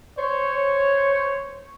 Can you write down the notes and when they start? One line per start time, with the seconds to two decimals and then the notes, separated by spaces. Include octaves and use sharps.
0.18 C5 C#5